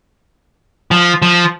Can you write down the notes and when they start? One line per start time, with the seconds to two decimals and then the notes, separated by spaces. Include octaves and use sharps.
0.91 F3
1.22 F3